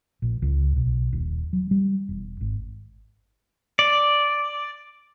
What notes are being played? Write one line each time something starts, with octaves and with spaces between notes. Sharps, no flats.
A#1
C#2
B1
D#1
F#3
G3
E1
G#1
D5